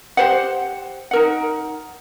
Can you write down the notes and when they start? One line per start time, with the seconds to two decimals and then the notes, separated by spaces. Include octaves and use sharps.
0.17 G4 C5 F#5
1.11 D#4 A#4 F#5